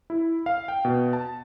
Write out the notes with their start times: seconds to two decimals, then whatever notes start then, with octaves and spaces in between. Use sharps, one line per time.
0.10 E4
0.46 F5
0.68 G5
0.85 B2
1.13 A5